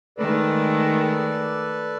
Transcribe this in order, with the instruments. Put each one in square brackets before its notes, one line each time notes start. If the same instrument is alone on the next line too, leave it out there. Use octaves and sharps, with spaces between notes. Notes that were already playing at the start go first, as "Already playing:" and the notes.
[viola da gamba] D#3 G#3 A3 [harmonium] A4 B4 D5